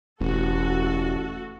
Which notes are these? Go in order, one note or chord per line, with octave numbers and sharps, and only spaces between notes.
E1 A1 F#4 A4